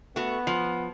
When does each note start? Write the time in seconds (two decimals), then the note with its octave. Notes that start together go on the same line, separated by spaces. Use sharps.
0.16 A3 B3 F#4
0.47 F3